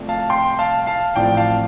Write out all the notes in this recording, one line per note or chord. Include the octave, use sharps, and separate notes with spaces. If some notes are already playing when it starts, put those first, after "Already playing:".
Already playing: C2 C3 F3 A3
F5 A5
G5 C6
F5 A5
F5 A5
A1 A2 F3 C4 D5 G5
F5 A5